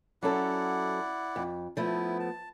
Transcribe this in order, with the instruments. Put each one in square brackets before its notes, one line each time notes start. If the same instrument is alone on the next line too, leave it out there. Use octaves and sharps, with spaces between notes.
[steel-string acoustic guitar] F#3 C#4 A4 [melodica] E4 D5 F#5
[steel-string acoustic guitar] F2
[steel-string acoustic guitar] F3 A3 B3 [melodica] E4
[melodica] A5